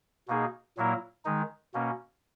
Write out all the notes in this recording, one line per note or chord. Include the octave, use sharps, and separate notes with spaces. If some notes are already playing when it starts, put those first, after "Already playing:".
B2 A#3 D#4 G#4
A#2 F#3 A#3 E4 A#4
D#3 G#3 D#4
B2 A#3 C#4